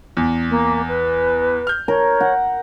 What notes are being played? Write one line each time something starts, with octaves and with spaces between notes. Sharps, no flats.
E2
A#3
B4
F6 G6
A#4 C#5
F#5